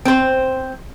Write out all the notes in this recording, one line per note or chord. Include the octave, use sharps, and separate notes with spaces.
C4 C5